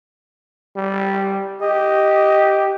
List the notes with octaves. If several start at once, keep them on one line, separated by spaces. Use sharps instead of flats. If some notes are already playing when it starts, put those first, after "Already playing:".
G3
G4 D#5